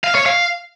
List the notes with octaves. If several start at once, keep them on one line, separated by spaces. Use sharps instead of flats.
F5
C#5
F5